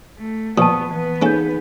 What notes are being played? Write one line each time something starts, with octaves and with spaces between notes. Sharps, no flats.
A3
A#2 F3 B3 A5 C#6 D#6
E3 B3 B4
A#3 C#4 D#4 G#4 A4 G6